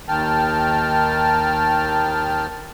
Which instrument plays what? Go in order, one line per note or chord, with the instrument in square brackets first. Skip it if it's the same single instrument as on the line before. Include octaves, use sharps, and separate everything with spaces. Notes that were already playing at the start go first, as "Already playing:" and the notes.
[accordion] D#2 D#3 G5 A5 F6